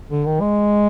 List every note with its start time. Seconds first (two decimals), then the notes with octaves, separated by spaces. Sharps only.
0.10 D3
0.25 D#3
0.41 G#3